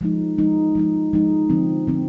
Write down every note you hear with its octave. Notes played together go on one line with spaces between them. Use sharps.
F3 G#3 D#4
F3 G#3 D#4
F3 G#3 D#4
F3 G#3 D#4
D3 F3 C4
D3 F3 C4